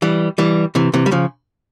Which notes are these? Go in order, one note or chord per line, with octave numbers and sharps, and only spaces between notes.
E3 G3
E3 G3
C3 E3
C3 E3
G3
C#3 F3